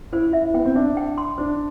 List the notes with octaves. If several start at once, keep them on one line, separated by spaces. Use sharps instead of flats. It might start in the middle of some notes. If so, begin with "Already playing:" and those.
E4 C5
E4 E5
B3 G5
C4
D4 E5
G5
C6
D4 C5